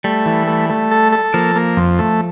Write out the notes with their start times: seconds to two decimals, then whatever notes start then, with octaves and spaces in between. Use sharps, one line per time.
0.04 G3 A3
0.26 E3
0.47 A3
0.70 A3
0.91 A4
1.12 A4
1.34 F3 A#3
1.56 A#3
1.77 F2
1.99 A3